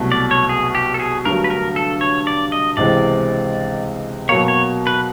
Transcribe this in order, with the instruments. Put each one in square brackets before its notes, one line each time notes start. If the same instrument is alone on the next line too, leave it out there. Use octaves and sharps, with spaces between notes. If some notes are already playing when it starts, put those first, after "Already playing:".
Already playing: [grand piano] C2 B2 F#3 A3
[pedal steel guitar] D5
C#5
G#4
G4
A4
G#4
[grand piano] G2 D3 F#3 A3 [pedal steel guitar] A#4
[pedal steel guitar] B4
A#4
A4
C#5
D5
D#5
[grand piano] C#2 C3 E3 G#3 C4 [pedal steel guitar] D5
[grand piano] B2 F#3 A#3 [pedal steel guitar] C#5
[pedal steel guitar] C#5
B4